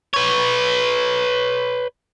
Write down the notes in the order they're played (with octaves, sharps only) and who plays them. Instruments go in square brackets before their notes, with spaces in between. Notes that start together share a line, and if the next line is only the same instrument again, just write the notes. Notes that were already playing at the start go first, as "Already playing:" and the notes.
[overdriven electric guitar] B4 C#5